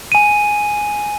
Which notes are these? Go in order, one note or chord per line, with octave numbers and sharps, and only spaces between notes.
G#5 D#7